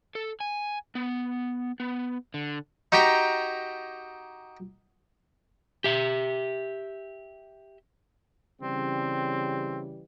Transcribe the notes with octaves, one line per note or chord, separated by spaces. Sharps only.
A4
G#5
B3
B3
D3
D#4 F#4 G4 G5 A#5
G4 E5
C#3 E3 G3 C4